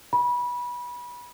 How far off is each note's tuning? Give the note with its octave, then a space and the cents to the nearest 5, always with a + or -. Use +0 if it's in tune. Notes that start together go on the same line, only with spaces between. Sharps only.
B5 -25